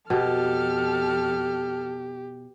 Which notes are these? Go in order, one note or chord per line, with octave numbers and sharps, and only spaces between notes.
F2 B2 G4 A4 F6